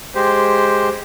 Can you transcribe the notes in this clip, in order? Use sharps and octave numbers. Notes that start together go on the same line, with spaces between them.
G#3 G4 C5